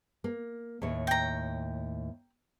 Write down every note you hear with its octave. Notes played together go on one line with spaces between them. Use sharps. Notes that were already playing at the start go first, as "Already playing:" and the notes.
A#3
D#2 A2 C#5
G5 A#5